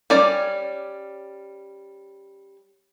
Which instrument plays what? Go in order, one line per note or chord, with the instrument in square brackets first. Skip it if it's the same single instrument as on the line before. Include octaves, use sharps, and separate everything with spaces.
[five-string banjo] G3 C#4 D5